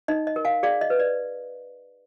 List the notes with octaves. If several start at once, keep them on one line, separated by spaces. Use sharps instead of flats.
D#4 D#5
D#5
A#4
F5 G#5
G#4 D5 F5
D#5
B4
D5